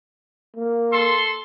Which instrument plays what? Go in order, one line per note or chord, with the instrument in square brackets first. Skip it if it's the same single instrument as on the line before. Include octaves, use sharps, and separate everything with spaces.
[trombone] A#3
[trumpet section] A4 C6